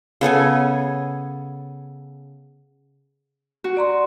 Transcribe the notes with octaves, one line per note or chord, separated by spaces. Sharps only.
C#3 B3 A4 G#5
F#4
D5 A#5 C6